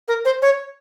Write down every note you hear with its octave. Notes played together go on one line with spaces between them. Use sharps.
A#4
C5
C#5